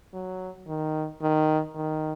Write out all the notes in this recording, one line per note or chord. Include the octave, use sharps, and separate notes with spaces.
F#3
D#3
D#3
D#3